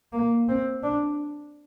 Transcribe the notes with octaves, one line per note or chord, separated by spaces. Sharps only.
A#3
C4
D4